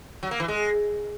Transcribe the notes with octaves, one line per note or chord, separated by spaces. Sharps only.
F#3
A#3
E3
G#3